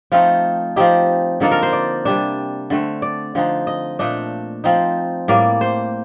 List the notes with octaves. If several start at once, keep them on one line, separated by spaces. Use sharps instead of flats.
F3 A3 C4 D#4 F4
F3 C4 D#4 G4
D3 F3 A#3 D#4 A4
A#4
C5
D5
C3 G3 D4
D3 A3 C4
D5
D3 F3 C4 D#4
D#5
A#2 A3 D4 D#5
F3 C4 D#4
A2 G3 A#3 D5
C5